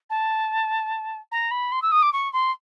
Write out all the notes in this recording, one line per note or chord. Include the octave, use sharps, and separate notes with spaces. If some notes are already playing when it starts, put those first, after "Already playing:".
A5
A#5
B5
C6
E6
D#6
D6
C#6
C6